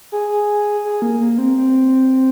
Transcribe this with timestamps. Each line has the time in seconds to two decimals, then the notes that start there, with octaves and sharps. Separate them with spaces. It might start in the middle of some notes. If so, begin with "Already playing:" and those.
0.12 G#4
0.85 G#4
1.02 A#3
1.20 A#3
1.38 C4
1.57 C4